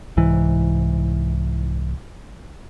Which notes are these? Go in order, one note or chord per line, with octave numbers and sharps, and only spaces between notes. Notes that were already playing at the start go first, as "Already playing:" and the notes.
C2 G#2 E3